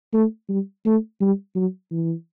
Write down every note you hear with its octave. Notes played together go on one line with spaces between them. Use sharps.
A3
G3
A3
G3
F#3
E3